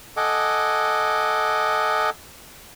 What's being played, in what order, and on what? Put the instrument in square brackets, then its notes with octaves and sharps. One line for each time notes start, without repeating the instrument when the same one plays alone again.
[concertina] A4 D#5 F#5 G#5 D6